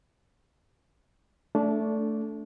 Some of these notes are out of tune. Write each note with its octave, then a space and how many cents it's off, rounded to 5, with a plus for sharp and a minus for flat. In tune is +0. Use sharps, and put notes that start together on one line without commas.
A3 +0 D4 -20